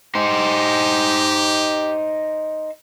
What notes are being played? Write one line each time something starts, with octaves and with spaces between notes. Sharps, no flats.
D#4 G4 C5